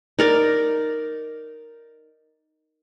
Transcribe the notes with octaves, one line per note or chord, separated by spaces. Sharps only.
D#4 A#4 D5